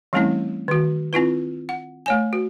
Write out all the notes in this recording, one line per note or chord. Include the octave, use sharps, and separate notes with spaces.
E3 G3 A3 C4 C#4 E4
D#3 F#4
C4 E4 F4 B4
F#5
A3 C#5 G#5
F#4